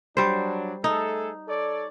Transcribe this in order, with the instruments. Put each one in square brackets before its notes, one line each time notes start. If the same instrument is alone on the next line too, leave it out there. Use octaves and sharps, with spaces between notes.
[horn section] F#3 D4 [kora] G3 C5
[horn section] A3 G#4 A4 [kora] D#4
[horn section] A4 C#5 D5